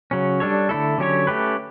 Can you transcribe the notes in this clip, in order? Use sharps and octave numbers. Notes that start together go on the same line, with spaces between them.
C#3 F#3 C#4
G3 D4 A4 C#5
D3 A3 E4 A4
D3 F#3 C#4 G4 C#5
A3 C#4 G4 B4